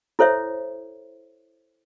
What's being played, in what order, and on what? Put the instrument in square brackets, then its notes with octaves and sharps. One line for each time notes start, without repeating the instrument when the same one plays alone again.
[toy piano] E4 A4 C5 C#5 E5